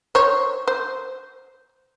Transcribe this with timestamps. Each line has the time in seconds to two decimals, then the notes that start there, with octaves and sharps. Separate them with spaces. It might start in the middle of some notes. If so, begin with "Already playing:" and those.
0.15 C5 C#5
0.67 C5